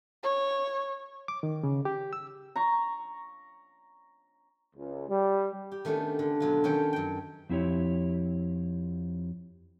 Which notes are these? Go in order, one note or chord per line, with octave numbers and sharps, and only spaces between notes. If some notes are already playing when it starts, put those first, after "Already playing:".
C#5
D6
D#3
C#3
G4
E6
A#5 C#6
C#2
G3
G4
D#3 A3 B3 C#4 D4
D3
B2 F#3 F4
D#3 C#4 A4 C#5 G5
F#2 G5
F2 C4 E4 G4 C#5